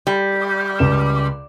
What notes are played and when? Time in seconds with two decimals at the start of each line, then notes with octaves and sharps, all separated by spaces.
0.07 G3
0.79 C#2 E7